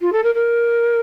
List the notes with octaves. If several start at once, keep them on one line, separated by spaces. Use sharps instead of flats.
F4
A4
A#4
A#4